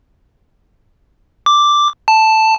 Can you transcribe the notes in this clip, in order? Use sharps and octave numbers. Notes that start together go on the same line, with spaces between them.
D6
A5